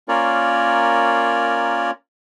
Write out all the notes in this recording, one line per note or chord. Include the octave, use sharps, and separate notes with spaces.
A#3 C#4 F4 A#4 C#5 D5